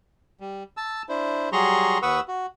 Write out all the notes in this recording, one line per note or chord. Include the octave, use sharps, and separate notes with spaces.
G3
A5 E6
D4 E4 C5
F#3 G3 G#4 A#5 C6 C#6
D#2 B4 F#5 C#6 D#6 E6
F#4